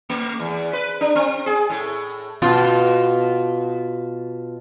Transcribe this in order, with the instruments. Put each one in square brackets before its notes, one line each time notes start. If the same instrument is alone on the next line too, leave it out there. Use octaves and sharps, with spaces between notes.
[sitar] A3
E2
B4
D4
C4
G#4
A2
B2 F4